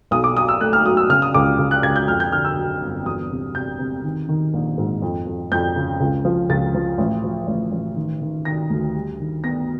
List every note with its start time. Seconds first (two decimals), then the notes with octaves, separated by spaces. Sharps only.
0.11 B1 D#6
0.24 D6
0.36 F#3 D#6
0.49 E6
0.61 A3 F#6
0.73 F6
0.85 F#3 D#6
0.97 E6
1.10 C#3 F6
1.22 D#6
1.34 C#2 D6
1.59 C#2
1.71 F#6
1.83 C#2 G#6
1.96 G6
2.08 F2 F6
2.20 G6
2.32 D3 F6
2.45 E6
2.57 F#3
2.81 G1
3.06 E2 D#6
3.30 C3
3.55 C3 G6
3.79 C3
4.04 D#3
4.29 D#3
4.54 A#1
4.78 G#2
5.02 F2
5.26 F2
5.52 F2 G6
5.76 C#3
6.00 C#2
6.25 F3
6.49 C#2 A6
6.74 F3
6.98 A1
7.24 F3
7.47 A1
7.72 A1
7.96 D#3
8.22 D#3
8.45 D#3 A#6
8.70 D2
8.94 G3
9.20 D#3
9.44 B3 A#6